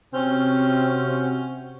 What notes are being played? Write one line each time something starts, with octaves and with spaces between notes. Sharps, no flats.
C3 C4 C#4 F#4 F6 G6